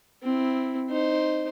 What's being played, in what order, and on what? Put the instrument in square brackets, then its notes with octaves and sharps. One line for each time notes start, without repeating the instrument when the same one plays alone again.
[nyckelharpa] C4 E4
D#4 C5